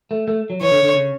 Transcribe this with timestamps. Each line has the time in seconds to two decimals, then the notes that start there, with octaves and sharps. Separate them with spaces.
0.11 A3
0.28 A3
0.50 F#3
0.61 E3 C#5
0.71 D3
0.82 D3
0.94 C#3